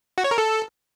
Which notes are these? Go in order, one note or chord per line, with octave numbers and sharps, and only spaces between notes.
F#4
C#5
A#4
A4